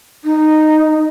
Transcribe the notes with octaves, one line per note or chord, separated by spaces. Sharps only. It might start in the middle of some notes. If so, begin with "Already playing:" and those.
D#4